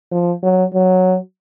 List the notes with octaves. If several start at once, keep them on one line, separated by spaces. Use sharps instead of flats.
F3
F#3
F#3